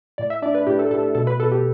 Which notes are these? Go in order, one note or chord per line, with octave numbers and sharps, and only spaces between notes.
A2 D5
E5
D4 D5
B4
A2 G4
A4
A2 A4
A4
B2 A4
B4
B2 A4
G4